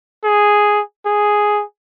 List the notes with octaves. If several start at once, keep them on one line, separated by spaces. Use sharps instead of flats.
G#4
G#4